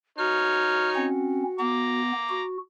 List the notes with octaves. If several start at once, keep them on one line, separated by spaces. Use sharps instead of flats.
D#4 F#4 C#5 F6
C4 C#4
B3 A#5 D6
F#4